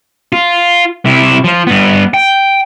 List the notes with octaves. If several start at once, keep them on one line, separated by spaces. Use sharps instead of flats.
F4
C3 E4
F3 F4
G2 B3
G5